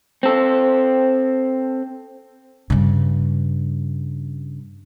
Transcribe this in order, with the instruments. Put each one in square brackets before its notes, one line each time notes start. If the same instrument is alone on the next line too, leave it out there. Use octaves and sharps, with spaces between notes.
[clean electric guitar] C4 A4
[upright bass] G2 C#3